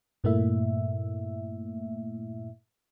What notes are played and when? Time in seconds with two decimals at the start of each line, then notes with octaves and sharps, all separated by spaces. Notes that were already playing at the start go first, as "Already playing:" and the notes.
0.24 G2 A#2 A3 A#3 E4 E5